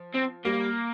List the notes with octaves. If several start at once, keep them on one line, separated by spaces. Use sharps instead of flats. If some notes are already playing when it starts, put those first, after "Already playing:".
Already playing: F3
C4
G3 A#3